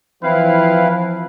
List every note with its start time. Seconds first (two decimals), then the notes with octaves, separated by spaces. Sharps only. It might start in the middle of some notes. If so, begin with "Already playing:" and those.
0.23 E3 F3 C4 E4 B4 F5